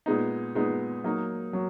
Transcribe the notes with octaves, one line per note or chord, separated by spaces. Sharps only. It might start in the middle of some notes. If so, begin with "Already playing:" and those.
A#2 G#3 B3 D#4
A#2 G#3 B3 D#4
F#3 A#3 D#4
F#3